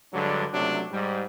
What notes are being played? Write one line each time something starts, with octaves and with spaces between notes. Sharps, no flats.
G2 D3 F#3 G#3 D4
C#2 C3 F#3 A3 D4
G#2 G3